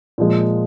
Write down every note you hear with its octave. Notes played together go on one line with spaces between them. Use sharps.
A#2 F3 G#3